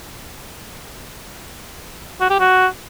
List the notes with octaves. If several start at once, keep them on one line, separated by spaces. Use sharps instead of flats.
F#4
G4
F#4